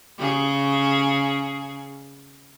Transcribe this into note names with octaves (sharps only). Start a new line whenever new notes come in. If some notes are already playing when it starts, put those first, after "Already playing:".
C#3 G#4